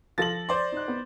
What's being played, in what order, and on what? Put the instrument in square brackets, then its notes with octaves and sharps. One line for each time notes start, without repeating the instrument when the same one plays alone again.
[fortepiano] F3 F4 A4 [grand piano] A6 A#6 F#7
[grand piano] C5 D5 C6
[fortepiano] D#4 F#6
B3